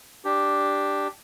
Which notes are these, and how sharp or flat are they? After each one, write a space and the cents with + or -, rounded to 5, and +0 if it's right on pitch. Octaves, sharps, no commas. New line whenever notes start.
D4 +0 G4 +0